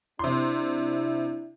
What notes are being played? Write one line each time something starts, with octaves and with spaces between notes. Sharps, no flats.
C3 D4 E4 C6